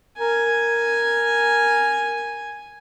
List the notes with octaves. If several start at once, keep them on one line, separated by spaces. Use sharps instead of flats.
A#4 G#5